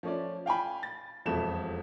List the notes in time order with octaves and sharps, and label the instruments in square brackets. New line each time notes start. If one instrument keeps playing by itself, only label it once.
[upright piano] F3 A3 C#4 C#5 D5
F5 G5 G#5 B5
A6
E1 F2 A3 E7